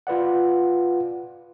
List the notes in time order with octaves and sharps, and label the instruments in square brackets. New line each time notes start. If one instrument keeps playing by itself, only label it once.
[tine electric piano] F4 B4 D5 F#5